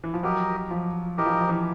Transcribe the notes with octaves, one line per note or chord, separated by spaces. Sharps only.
E3
F3
F#3 G4 A#4 D#5
F3
E3 G4 A#4 D#5
F3
E3
F3
E3